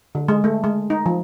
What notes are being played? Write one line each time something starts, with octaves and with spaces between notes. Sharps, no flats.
D3
G#3
A3
G#3
D#4
F3